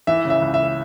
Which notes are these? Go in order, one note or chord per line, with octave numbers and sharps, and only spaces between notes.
E3 E5
C#3
E5
C#2
E5